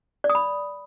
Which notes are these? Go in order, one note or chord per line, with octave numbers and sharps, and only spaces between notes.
D5
D#6
B5